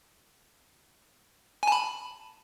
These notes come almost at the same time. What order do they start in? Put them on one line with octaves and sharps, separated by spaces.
G#5 A5 B5